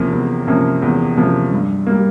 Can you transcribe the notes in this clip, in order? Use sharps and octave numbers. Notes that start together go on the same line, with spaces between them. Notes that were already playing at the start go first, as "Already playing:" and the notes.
Already playing: E2 C3 F3 A#3 C#4
E2
C3 F3 A#3 C#4
E2
C3 F3 A#3 C#4
G2
G3 A#3